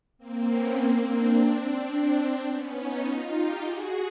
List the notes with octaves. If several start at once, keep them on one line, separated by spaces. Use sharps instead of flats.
A#3 C4
B3 C#4
A#3 C4
C4 D4
C4 D4
B3 C#4
C#4 D#4
D#4 F4
F4 G4
F#4 G#4